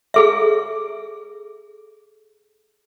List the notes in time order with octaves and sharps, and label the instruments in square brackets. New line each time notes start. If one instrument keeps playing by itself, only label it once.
[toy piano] G#4 A4 E5